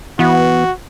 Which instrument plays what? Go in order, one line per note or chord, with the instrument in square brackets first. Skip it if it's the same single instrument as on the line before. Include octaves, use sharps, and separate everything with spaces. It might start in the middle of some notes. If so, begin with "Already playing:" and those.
[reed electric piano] E3 [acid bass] B3 [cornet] F#4